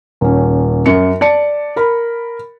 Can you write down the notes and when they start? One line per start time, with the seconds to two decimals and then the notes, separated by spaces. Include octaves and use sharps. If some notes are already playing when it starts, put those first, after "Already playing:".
0.21 D#1 C#4
0.86 F#2 C#7
1.21 D5 A5 C#7
1.76 A#4 B5